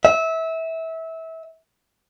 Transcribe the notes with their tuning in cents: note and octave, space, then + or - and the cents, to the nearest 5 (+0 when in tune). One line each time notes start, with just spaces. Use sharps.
E5 -25